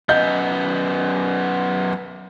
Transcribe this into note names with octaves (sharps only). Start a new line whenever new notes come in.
F#2 B3 D#5 G6